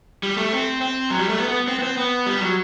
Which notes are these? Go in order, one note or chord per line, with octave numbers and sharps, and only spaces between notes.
G3
A3
C4
C4
F#3
G3
A3
B3
B3
C4
B3
C4
B3
G3
F#3